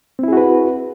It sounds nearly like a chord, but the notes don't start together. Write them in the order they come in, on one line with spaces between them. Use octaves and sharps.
C4 E4 G#4 F#4 B4